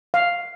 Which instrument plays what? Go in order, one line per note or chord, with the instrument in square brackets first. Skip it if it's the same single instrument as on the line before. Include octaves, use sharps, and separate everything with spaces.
[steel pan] F5